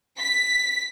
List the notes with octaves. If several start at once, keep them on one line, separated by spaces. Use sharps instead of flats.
B6